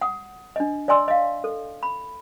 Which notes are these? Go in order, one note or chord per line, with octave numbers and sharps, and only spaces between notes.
F#5 D#6
D4 D#5
D5 D#5 G#5 C6 E6
D#5 F5
A4
B5